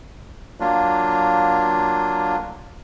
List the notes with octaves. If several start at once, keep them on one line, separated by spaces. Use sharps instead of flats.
F#3 A#3 D4 F4